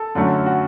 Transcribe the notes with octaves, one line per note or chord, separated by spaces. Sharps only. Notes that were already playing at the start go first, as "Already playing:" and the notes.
Already playing: A4
F#2 D3 F#3 A3
F#4